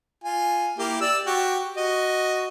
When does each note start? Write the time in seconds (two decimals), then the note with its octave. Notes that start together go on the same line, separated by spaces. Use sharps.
0.24 F4 G#5
0.78 A#3 E4 G4
1.01 D5 E6
1.26 F#4 G4
1.77 F#4 D#5